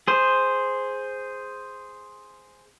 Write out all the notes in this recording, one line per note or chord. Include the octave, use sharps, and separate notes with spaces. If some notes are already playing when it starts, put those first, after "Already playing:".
G#4 C5